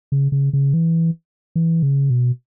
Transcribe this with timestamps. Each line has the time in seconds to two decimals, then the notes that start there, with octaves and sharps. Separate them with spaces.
0.12 C#3
0.32 C#3
0.53 C#3
0.74 E3
1.56 E3
1.83 C#3
2.10 B2